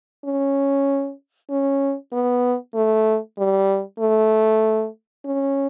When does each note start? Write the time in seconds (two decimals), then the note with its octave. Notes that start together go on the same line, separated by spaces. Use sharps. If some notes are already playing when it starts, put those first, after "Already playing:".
0.24 C#4
1.50 C#4
2.12 B3
2.75 A3
3.38 G3
3.99 A3
5.25 C#4